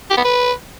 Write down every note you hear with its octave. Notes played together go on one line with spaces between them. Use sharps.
G4
B3
B4